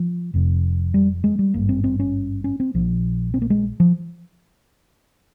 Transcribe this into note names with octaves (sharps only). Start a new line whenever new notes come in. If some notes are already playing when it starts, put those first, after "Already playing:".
Already playing: F3
F1 F2 C3
G3
G#3
G3
G#1 G2 A#3
C4
C4
C#4
C#4
C4
A#1 A#2 F3
C4
A#3
G#3
F3